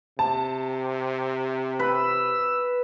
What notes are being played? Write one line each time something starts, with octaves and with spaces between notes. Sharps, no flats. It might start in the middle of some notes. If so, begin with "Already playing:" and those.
C3 A5
B4 E6